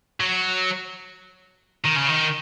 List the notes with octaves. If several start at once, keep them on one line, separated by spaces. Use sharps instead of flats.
F#3
D#3
C#3
D#3